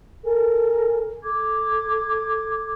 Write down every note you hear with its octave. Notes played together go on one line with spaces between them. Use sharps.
A4 A#4 G#5
A4 D6 G#6